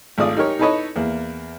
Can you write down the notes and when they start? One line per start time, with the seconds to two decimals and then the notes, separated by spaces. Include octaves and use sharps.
0.18 G#1 A3 F4 D5 D#6
0.37 D#4 G4 A#4 C#5
0.59 D#4 E4 A4 B4 C#5 D#5
0.96 E2 A#3